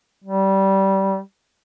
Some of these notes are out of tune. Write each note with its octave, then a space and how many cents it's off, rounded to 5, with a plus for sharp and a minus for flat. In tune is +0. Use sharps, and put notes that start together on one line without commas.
G3 -20